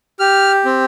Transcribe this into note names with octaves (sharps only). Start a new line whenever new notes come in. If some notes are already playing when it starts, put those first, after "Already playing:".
G4 F6
C4